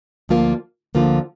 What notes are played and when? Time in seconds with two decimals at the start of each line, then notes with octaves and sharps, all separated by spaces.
0.29 D2 D3 F3 A#3 F4
0.95 D2 D3 F3 A#3 F4